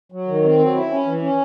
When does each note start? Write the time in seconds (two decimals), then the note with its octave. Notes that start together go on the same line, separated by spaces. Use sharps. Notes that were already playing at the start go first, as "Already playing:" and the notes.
0.12 F#3
0.27 D#3
0.44 C4
0.59 F#3
0.74 E4
0.90 C#4
1.06 E3
1.21 C#4